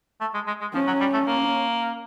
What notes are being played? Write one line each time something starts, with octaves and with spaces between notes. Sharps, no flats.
A3
G#3
G#3
G#3
F3 C#4
F#3
G3
A3
A#3